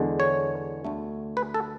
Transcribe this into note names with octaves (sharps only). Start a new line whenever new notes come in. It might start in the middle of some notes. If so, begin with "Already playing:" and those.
Already playing: E2 D3 G#3
C#5
D2 D3 A3
B4
A4